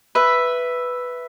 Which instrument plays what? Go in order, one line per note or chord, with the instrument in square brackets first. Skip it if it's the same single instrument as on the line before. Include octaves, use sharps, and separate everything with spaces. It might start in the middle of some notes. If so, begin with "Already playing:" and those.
[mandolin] B4 E5